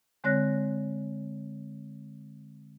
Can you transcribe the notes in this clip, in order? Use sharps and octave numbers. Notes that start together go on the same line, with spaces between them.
D3 G#3 C4 C#5 F#6 A#6